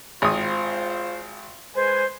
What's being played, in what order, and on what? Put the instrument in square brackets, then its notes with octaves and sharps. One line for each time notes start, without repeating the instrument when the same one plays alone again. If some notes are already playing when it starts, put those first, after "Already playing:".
[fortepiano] G#1 D#6 [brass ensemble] F4 C5
[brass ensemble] G#3 B4 G#5 [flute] C5